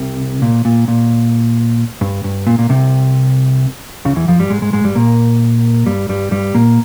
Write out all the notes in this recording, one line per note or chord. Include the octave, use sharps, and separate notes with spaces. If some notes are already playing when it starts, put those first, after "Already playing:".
Already playing: C2 C3
A#2
A#2
A#2
G2
G2
A#2
A#2
C2 C3
C#2 C#3
E2 E3
F2 F3
G2 G3
G#2 G#3
G#2 G#3
G#2 G#3
G2 G3
A#2 A#3
G2 G3
G2 G3
G2 G3
A#2 A#3